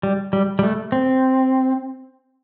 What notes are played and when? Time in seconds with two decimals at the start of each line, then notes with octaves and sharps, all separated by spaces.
0.03 G3
0.33 G3
0.59 G3
0.63 A3
0.92 C4